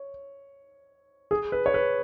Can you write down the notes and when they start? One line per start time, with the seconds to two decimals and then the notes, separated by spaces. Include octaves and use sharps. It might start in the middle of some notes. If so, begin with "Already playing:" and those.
Already playing: C#5
1.31 G#4
1.52 B4
1.66 C#5
1.74 B4